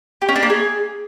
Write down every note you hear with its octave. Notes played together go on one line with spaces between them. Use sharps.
G4
C#4
D4
A#3
G#4